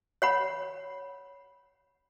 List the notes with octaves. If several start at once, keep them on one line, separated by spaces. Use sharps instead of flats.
C#5 F#5 B5